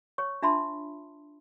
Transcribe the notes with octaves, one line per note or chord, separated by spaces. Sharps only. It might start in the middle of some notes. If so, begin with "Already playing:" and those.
C#5 C#6
D4 F4 E5 A5 B5 C6